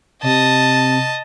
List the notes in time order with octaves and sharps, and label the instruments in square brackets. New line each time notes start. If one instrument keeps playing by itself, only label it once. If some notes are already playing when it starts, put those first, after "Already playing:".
[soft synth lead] C3 [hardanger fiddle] D#5 A5